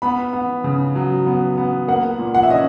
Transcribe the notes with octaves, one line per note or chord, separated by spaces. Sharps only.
B3 B5
B3
C#3
F#3
B3
B3
A#3 F#5
A#2
F#5
E5
C#4 D#5